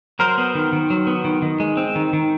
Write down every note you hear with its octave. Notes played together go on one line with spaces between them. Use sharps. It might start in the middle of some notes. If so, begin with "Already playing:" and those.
F#3 A#4 C5
B3
D#3
D#3
F#3
B3
D#3
D#3
G#3
C4
D#3
D#3